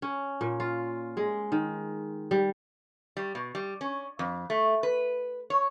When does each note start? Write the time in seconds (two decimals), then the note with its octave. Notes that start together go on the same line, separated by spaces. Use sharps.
0.02 C#4
0.41 A#2
0.60 F4
1.17 G#3
1.52 D#3
2.31 G3
3.17 G3
3.35 B2
3.55 G3
3.81 C#4
4.19 F2
4.50 A3
4.83 B4
5.50 C#5